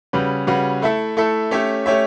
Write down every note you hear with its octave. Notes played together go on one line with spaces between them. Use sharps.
C#3 G3 C#4 F#4 B4
C#3 G3 C#4 F#4 B4
A3 E4 A4 E5
A3 E4 A4 E5
A3 C#4 G4 C#5 E5
A3 C#4 G4 C#5 E5